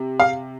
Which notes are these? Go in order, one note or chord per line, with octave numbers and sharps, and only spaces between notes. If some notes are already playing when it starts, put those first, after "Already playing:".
Already playing: C3
F5